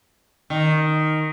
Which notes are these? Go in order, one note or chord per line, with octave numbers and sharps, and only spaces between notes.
D#3